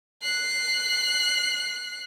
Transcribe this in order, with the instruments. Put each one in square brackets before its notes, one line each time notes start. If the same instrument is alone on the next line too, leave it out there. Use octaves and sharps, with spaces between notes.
[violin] F#6 C7